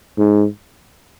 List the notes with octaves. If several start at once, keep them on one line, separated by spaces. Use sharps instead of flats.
G#2